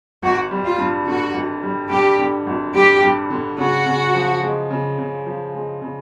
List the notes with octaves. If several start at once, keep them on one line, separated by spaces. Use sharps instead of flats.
G#1 F#4
G3
F4
G2
D3 F#4
G#1
G3
G2 G4
D3
G#1
G3 G4
G2
D3
C#3 F#4
C#3
F3
G#3
C#3
C#3
F3
G#3
C#3